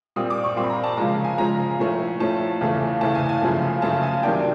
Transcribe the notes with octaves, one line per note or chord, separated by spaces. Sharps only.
A#2 G3 C4 D#6
D6
C#6
A#2 G3 C4 C6
B5
A#5
A5
C#3 F3 G#3 A#5
G#5
C#3 F3 G#3 A#5
A2 F3 A3 C#4
A2 F3 A3 C#4 A5
E2 C#3 E3 A3
E2 C#3 E3 A3 A5
G#5
G#5
F#2 C#3 F3 A3
F#2 C#3 F3 A3 A5
G#5
C3 D#3 F#3 A#3 D4 G5